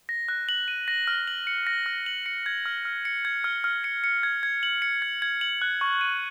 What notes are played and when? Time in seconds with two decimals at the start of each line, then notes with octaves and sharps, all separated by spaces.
0.09 A#6
0.28 F#6
0.49 F#7
0.68 D#7
0.88 A#6
1.08 F6
1.28 F#7
1.47 C#7
1.67 A#6
1.86 F6
2.06 F#7
2.26 C#7
2.46 G#6
2.66 F6
2.85 F6
3.05 C#7
3.25 G#6
3.44 F6
3.64 F6
3.84 C#7
4.04 C#7
4.23 G#6
4.43 G#6
4.63 F#7
4.82 C#7
5.02 G#6
5.22 G#6
5.41 F#7
5.62 F#6
5.81 C#6
6.01 D#7